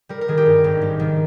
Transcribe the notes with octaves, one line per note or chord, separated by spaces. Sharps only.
G3 A#4
A#4
D#3 G#4
G4
G2
G#1
G3
D#3